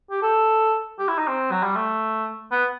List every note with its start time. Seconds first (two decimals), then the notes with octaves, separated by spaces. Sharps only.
0.11 G4
0.22 A4
0.99 G4
1.08 E4
1.18 D#4
1.28 C4
1.51 F#3
1.63 G3
1.76 A3
2.51 B3